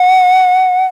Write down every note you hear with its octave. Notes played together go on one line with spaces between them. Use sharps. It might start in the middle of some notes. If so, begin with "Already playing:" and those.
Already playing: F#5